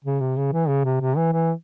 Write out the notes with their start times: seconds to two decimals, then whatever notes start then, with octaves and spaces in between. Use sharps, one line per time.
0.04 C#3
0.20 C3
0.37 C#3
0.53 E3
0.69 C#3
0.85 C3
1.01 C3
1.17 E3
1.33 E3